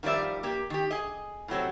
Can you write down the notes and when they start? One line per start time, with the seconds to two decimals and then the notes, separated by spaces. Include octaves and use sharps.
0.03 D#3 F3 G3 D5 E5
0.43 A#3 G4
0.70 D#3 G4
0.91 G#4 D#5
1.48 A2 C3 F#3 C4